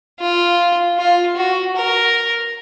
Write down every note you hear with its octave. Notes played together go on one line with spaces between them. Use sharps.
F4
F4
F#4
A#4